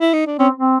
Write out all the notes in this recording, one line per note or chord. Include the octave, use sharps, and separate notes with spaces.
E4
D#4
D4
C4 C#4
C4